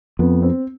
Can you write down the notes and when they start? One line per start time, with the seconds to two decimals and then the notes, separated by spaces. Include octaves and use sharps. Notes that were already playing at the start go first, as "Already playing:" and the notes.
0.19 F2 B3
0.42 C4